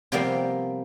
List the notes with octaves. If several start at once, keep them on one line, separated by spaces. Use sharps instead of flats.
C3 F3 G3 A#3 B3 G5